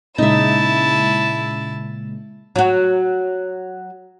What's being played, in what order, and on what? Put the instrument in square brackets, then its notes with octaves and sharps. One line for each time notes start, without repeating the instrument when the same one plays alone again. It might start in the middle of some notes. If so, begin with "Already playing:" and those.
[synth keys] A#2 C#3 G#3 [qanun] D#4 E5 [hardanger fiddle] E4 A5
[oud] F#3 F#4